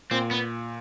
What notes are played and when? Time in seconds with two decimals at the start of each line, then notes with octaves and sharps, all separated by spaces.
0.11 A#2 C4
0.31 B3